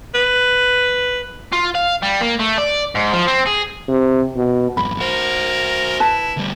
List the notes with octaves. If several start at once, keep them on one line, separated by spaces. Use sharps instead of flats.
B4
F4
F5
G3
A#3
A3
D5
G#2
F3
C4
G#4
C3
B2
E2 G2 B5
F#4 A#4 C5
E4 B4 A5
D2 G3